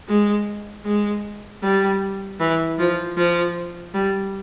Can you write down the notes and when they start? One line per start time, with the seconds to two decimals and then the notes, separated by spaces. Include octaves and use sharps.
0.09 G#3
0.85 G#3
1.63 G3
2.40 E3
2.79 F3
3.17 F3
3.94 G3